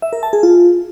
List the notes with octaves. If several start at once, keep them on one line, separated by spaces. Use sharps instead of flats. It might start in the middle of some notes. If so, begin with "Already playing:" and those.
E5
A#4
A5
G#4
F4